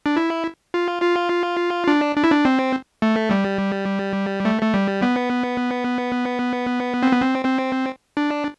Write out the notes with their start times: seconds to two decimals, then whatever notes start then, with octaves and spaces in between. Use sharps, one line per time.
0.06 D4
0.16 E4
0.74 F4
1.02 F4
1.88 D4
2.16 D4
2.24 E4
2.31 D4
2.45 C4
3.02 A3
3.31 G3
4.45 A3
4.62 A3
4.74 G3
5.02 B3
7.03 C4
7.12 B3
7.21 C4
7.45 C4
8.17 D4